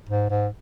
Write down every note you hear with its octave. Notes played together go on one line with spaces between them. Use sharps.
G#2
G#2